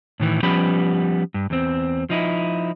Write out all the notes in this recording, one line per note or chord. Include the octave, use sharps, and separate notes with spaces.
A2 D#3 E3
F3 G3 B3 C#4 G4 B5
G2
E2 C4
F3 D#4 E4